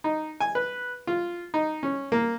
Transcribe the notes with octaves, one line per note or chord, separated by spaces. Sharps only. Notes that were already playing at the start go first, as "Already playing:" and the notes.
D#4
G#5
B4
F4
D#4
C#4
A#3